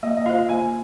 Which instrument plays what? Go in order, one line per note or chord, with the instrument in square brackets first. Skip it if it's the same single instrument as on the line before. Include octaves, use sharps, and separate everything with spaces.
[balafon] A#3 [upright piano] D#5
[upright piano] D#5
[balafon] F4 C5 [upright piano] F5
[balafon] A#3 [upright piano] G#5